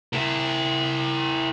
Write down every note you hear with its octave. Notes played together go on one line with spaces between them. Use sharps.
E4 A#4